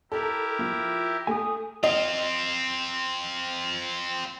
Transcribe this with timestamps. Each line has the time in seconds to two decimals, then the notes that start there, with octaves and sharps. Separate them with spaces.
0.12 E4 G4 A4 A#4
0.59 F3 F4
1.27 A3 G#5 D#6
1.84 C4 F4 D#5